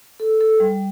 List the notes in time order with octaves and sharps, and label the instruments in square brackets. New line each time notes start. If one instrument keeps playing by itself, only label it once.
[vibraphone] A4
A4
G3